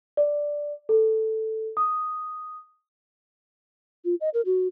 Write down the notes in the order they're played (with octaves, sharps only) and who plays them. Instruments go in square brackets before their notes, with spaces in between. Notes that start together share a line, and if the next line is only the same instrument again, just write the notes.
[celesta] D5
A4
D#6
[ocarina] F4
D#5
A#4
F#4